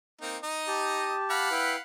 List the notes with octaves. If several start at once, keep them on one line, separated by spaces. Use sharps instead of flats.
A#3 C4 D#4
D#4 D#5
G4 A5
F5 F#5 B5
E4 B4 G5